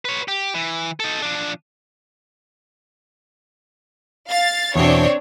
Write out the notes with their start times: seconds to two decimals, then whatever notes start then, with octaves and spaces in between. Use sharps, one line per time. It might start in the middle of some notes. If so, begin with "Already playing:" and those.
0.05 B4 C#5
0.28 G4
0.54 E3
1.00 D#4 A4
1.22 F3 D4
4.29 F5 A6
4.76 E2 B2 C4 D4 C#5